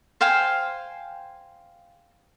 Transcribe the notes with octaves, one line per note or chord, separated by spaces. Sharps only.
C5 F5 G5 G#5